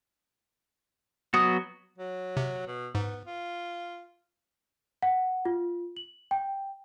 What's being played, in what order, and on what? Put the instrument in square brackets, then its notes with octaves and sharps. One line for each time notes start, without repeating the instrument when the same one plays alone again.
[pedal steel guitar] F#3 B3 F#4 [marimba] D#6
[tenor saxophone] F#3
[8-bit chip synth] C3
[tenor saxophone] B2
[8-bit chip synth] G#2 [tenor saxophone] B3
[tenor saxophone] F4
[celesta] F#5
F4
F#7
G5